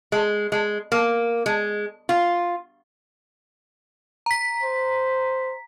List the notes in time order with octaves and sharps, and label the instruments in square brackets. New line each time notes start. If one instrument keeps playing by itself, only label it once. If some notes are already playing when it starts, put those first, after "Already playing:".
[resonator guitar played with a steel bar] G#3
G#3
A#3
G#3
F4
[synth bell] A#5 B6
[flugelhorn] C5